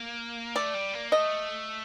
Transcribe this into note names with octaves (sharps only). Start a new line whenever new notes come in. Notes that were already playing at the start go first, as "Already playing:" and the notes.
Already playing: A#3
A3 D5
G3
A#3
A3 D#5